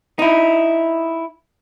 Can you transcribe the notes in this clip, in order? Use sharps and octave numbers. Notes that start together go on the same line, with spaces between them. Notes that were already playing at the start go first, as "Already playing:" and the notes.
D#4 E4